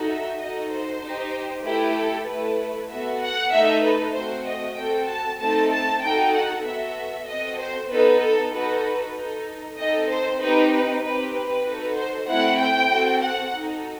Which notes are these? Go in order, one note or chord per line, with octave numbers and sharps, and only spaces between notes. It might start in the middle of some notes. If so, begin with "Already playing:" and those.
Already playing: D#4 F#4 A4
E5
D#4 F#4 A4 D#5
C5
D#4 G4
A3 E4 G4 B4
A4
A3 E4 A4 B4
B3 F#4 A4 E5
F#5
A3 D#4 A4 E5
B4
A3 C4 F#4 C5
D#5
C4 F#4 A4 G5
A5
A3 C4 D#4 A4 A5
A5
D#4 F#4 A4 G5
F#5
B3 F#4 A4 E5
C4 F#4 A4 D#5
C5
B3 D#4 A4 B4
A4
D#4 F#4 A4 B4
B4
D#4 A4
C4 D#4 A4 D#5
C5
C4 D#4 G4 B4
B4
C4 D#4 G4 B4
B4
D#4 F#4 A4
C5
A3 C4 E4 F#5
G5
C4 F#4 A4
F#5
D#4 F#4 A4